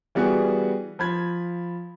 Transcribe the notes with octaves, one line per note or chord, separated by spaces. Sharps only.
E3 G3 B3 F#4 G#4
F3 B5 G#6